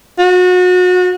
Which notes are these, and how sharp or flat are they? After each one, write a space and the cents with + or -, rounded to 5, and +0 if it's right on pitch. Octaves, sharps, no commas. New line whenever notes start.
F#4 -30